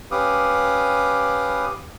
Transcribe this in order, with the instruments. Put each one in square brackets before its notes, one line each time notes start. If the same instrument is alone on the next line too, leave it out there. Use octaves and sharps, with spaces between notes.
[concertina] C#4 G4 B4 F5 D6 D#6